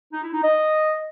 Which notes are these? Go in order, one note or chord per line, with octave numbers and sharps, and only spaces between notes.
D#4
E4
D#4
D#5